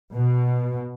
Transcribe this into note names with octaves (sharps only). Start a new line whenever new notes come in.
B2